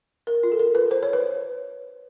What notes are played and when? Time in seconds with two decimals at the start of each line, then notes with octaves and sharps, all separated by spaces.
0.27 A#4
0.43 F4
0.52 A4
0.59 A#4
0.75 B4
0.91 C5
1.03 C#5
1.13 B4